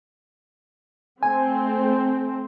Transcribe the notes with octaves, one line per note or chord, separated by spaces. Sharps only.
A3 C4 G#5